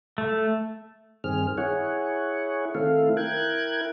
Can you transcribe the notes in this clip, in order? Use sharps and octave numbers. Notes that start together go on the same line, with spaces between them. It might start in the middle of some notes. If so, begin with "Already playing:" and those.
A3
G2 D#3 C4 G#4 F6
E4 G#4 C#5 F#5
D#3 A3 C4 E4 A4 F5
E4 A#4 G5 F#6 G#6